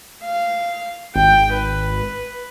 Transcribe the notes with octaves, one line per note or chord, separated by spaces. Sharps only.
F5
G#1 G5
B4